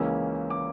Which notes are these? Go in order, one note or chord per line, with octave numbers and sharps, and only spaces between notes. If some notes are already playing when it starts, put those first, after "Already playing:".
Already playing: C#2 C#3 E3 A#3 C#4 E6
D6